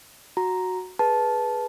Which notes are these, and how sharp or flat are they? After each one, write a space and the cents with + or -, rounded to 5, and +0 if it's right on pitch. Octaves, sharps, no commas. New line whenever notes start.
F#4 -5 A#5 +0
G#4 +0 B4 -15 A5 -15